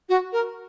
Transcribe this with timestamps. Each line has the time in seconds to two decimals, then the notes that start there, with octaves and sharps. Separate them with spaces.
0.09 F#4
0.32 A#4